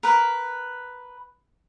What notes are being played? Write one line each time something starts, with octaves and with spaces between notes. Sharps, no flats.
A#4 B4